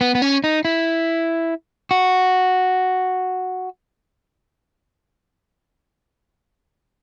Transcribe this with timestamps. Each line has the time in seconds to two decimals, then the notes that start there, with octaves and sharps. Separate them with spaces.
0.01 B3
0.15 B3
0.22 C#4
0.44 D#4
0.65 E4
1.91 F#4